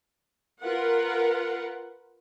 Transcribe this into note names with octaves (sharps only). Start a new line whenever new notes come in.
F4 A#4 B4 F#5